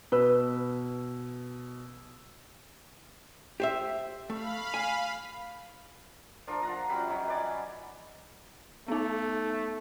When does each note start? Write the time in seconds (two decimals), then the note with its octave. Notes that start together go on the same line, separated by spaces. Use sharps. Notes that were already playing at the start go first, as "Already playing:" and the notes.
0.12 B2 B4 E6
3.60 G4 C5 E5
4.30 A3 F5 B5
4.74 G#5
6.47 F3 D4 F4 A#4
6.63 F4 F#5 A#5
6.89 F#2 G3 B5
7.08 F#2 D#3 F#3
7.28 B4 D5 G#5
8.88 A3 B3 D#4